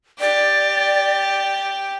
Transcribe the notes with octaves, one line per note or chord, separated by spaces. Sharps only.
G4 D5